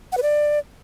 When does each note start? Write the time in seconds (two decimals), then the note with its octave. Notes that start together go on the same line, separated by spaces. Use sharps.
0.12 F#5
0.17 B4
0.23 D5